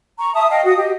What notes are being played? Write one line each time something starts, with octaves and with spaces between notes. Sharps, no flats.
A#5 C#6
E5 A5 D#6
D#5 F5 G5
F#4 D#6
G4 D#5